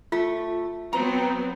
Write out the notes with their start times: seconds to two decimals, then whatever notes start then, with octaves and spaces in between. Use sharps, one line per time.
0.12 A3 F4
0.93 F#3 B3 C4 A#5